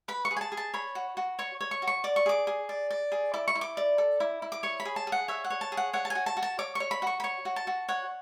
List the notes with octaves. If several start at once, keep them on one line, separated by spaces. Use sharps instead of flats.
B4 B5
C#6
G#4
G#5
A5
G#4
A5
C#5 B5
F#4
F#4
C#5 C#6
C#5
C#6
F#4
C#6
D5 D6
C#6
G#4 D6
G#4
D5
D5
G#4
E4 D6
C#6
E4
D6
D5
A4
E4
E4
D6
C#5 C#6
B5
G#4
A5
G#4
F#5
C#5 E5
F#5
C#5
A5
G#4
F#5
C#5 F#5
A5
G#5
F#4
A5
F#4
A5
C#5 D6
C#6
C#5
B5
F#4 C#6
B5
C#5 C#6
F#4
A5
F#4
C#5 F#5